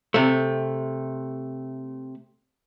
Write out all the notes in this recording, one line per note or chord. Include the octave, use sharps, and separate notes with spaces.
C3 A3